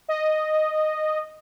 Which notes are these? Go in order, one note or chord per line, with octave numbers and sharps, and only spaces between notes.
D#5